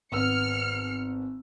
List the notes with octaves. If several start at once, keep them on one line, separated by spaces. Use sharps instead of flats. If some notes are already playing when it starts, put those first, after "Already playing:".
G#1 B3 E6 F6 C#7